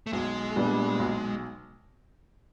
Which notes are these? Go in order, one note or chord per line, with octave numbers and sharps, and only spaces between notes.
A3
B1 G#3
A#2 G3 B3 D4
B1